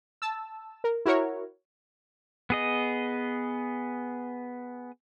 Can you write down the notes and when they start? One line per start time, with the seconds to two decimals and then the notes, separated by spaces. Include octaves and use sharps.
0.22 A5 E6
0.84 A#4
1.05 E4 F#4 A#4 C#5
2.50 B3 G#4 D#5